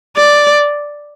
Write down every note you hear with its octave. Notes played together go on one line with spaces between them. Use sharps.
D5